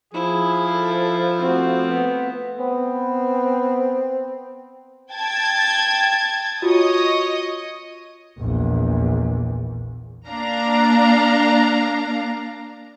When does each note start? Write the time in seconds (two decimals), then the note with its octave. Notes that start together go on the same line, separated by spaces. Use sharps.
0.14 F3 E4 G#4
0.73 A4
1.41 A3 C4 F#4
1.88 B3
2.59 B3 C4
5.13 G5 A5 G#6
6.62 F4 F#4 C#5 D#5 D#6
8.39 A#1 E2
10.28 A#3 D4 F5 A#5